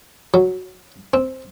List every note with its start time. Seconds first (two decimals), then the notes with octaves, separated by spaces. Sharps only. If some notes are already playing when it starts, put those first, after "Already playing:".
0.34 F#3
1.14 C4